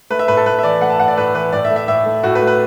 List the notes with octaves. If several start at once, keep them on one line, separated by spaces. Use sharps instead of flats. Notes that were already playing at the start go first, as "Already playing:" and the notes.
A3 B4
E5
A2 B4
A4
A2 B4
E5
E3 D5
A3 F#5
A5
A2 F#5
D5
A2 B4
E3 B4
A2 D5
E5
A3
E5
A2 E5
A3
A2 F#4
B4
A3
B4